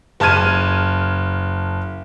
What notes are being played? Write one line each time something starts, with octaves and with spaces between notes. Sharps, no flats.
F#1 A5 F6 G#6 D#7